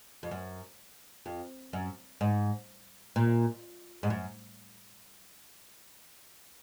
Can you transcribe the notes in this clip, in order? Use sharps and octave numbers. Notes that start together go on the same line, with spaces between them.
F2
F#2
F2
F#2
G#2
A#2
G#2
F#2